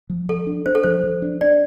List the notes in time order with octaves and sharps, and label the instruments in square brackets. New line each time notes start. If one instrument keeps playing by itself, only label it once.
[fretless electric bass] F3
[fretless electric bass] F3 [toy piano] A4
[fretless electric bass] D4
[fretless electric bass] D4 [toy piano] C5
[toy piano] A4
[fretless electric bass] F3 [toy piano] C5
[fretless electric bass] F3
D4
[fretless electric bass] D4 [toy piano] D5